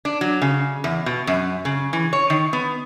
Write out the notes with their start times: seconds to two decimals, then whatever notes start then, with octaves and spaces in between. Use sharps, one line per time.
0.05 D4
0.21 F#3
0.42 C#3
0.84 E2
1.06 B2
1.27 F#2
1.65 C#3
1.93 E3
2.13 C#5
2.30 D#3
2.53 B3